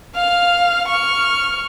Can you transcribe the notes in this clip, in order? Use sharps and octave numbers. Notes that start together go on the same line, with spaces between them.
F5 F6
C#6 F6